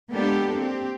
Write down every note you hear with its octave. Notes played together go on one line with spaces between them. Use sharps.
G#3 A#3 B3 D4 G4 A4
C4 G4